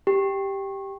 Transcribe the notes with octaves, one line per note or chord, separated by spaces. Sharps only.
G4